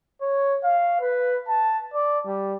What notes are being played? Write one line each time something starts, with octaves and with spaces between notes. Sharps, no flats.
C#5
F5
B4
A5
D5
G3